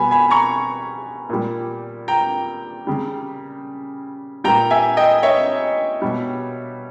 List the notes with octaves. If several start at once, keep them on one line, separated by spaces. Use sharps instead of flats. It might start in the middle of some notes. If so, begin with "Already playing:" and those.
Already playing: B2 G3 G#5 B5
G#5 B5
A#5 C#6
A#2 G3
G5 A#5
C#3 G3
A#2 G3 G5 A#5
E5 G#5
D#5 G5
C#5 E5
B2 G3